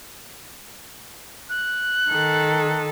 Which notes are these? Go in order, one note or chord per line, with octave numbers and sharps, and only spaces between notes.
F#6
D#3 A4